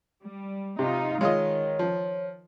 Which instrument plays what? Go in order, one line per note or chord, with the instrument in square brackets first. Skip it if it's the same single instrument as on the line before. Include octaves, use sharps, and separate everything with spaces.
[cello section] G3
[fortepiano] C3 [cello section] D#4 F4
[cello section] D#3 [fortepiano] G#3 F4 D#5 [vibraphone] C#5
[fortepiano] F3